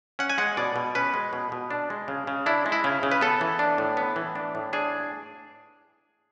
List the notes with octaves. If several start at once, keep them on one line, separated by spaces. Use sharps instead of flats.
C#4 F#5
G#5
G#3 F#5
B2 D5
B2
C#4 B4
G#3
B2
B2
D4
G#3
C#3
C#3
D4 E4
G#3
E4
C#3
C#3
B4
B3 A4
E3
D4
A2
B3
E3
D4
A2
D4 G#4